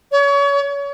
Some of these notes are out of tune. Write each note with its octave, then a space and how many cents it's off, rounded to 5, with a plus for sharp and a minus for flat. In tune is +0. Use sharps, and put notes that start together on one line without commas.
C#5 +30